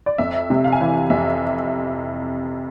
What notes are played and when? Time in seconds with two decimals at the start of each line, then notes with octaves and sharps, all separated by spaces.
0.06 D5
0.18 F2 E5
0.50 C3
0.64 F5
0.72 G#5
0.80 E3 F5
1.10 F2 E5